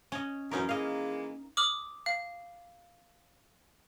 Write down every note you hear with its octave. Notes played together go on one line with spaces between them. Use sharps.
C#4 C#5 D#5
F#2 E3 C#4 D#4 A#4
E3 G#3 A#3 D#5 F5
D6 D#6 F6 F#7
F5